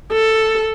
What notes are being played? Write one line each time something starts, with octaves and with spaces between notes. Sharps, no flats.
A4